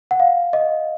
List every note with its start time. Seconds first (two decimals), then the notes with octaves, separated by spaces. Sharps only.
0.11 F#5
0.20 F5
0.53 D#5